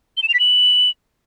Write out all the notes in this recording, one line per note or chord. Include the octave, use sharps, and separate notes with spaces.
G7
E7
F7
B6
F#7